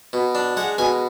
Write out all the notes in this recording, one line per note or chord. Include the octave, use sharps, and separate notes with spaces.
B2
D4
G#3 F#5
B2 G#5